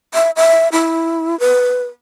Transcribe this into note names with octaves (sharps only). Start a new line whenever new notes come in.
E5
E5
E4
B4